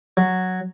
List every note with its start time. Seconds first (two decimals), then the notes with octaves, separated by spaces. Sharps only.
0.17 F#3